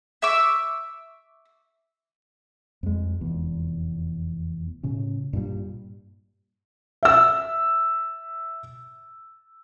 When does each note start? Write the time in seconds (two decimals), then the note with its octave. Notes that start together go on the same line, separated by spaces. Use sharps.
0.22 E5 C#6 D6 E6
2.83 F2 G#3
3.21 F1 E2
4.83 A2 C#3 C#4
5.33 G2 A#2 G3
7.03 E5 E6